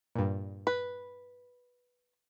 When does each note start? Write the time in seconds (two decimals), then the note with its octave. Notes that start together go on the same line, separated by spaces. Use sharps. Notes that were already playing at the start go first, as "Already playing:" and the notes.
0.16 G2 A#2
0.67 B4